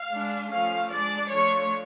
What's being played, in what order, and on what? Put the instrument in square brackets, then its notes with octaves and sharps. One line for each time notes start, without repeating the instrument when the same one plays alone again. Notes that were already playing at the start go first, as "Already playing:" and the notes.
Already playing: [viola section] F5
G#3 D4
F3 A3 C#4 F5
G#3 D4 D5
F3 A3 D4 C#5